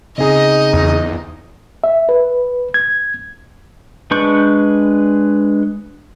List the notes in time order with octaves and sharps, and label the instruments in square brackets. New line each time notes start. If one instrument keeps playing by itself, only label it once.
[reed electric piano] C#3 C4 G#4 [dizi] D#4 [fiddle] D#5
[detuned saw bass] E2
[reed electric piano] E5
B4
G#6
[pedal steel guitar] G#3 D4 B4 C#6 G6